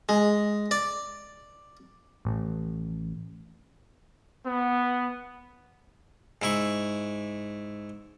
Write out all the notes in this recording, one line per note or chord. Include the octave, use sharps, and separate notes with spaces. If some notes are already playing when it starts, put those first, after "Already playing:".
G#3
D5
A1
B3
G#2 E4 C#6